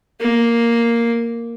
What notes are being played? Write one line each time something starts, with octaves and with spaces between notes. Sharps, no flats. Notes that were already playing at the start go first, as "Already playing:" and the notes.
A#3